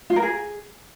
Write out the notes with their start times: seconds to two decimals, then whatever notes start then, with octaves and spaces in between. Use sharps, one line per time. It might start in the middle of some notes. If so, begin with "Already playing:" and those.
0.10 F4
0.16 A#4
0.22 G#4